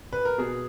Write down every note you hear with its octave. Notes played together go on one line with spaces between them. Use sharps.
B4
A#4
B2 G#4